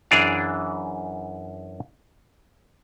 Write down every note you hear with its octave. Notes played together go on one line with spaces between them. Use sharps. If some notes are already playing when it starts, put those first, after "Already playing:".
F#2 E3 D4 G#4 D5 F5